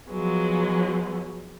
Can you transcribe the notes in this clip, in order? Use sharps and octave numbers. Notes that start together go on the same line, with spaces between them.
F3 F#3 G#3 B3